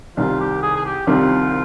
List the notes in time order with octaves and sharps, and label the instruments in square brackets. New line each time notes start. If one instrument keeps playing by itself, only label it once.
[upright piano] C2 C3 D#3 G3 C4 [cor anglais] F4
[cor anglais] G4
G#4
G#4
G4
[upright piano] C2 C3 D#3 G3 C4 [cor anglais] F4